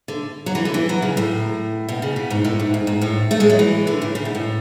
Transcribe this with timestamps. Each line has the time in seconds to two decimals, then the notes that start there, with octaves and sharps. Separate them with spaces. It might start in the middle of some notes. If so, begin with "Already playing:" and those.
0.08 D3
0.46 F#3
0.55 E3
0.65 D3
0.74 E3
0.89 F#3
1.02 C#3
1.17 A2
1.89 B2
2.02 C#3
2.16 B2
2.30 G#2
2.45 A2
2.59 G#2
2.74 G#2
2.87 G#2
3.01 A2
3.31 A3
3.40 G#3
3.50 F#3
3.59 E3
3.87 D3
4.02 A2
4.15 C#3
4.25 B2
4.35 A2